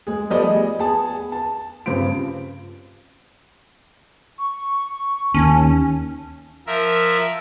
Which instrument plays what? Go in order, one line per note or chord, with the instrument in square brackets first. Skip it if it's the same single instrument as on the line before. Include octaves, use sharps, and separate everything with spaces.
[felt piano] G#3 G#4
F3 G3 A3 B3 D5 D#5
G#4
B3 G#4 A5
A5
G2 C#3 C4 F4 D7
[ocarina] C#6
[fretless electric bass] D#2 [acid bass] C#4 [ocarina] A5
[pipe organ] F3 A#4 E5